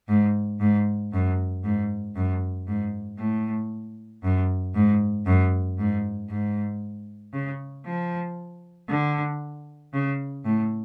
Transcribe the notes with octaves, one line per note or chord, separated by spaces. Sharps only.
G#2
G#2
F#2
G#2
F#2
G#2
A2
F#2
G#2
F#2
G#2
G#2
C#3
F3
D3
C#3
A2